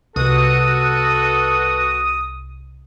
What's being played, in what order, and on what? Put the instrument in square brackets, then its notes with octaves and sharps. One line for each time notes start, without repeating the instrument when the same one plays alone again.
[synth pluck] C2 [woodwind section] B2 F#4 [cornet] A4 [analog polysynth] D#6